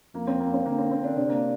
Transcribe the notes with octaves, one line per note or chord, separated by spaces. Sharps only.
F2 A#3
C4
A#3
C4
D3 A#3
C4
C4
D4
C3 D4
A#3